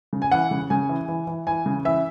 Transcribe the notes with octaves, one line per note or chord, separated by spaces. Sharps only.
C#3
G#5
E3 F#5
C#3
C#3 G#5
E3
E3
E3
E3 G#5
C#3
E3 E5